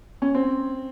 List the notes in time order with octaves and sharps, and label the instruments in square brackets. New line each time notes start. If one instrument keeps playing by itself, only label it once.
[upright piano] C#4
C4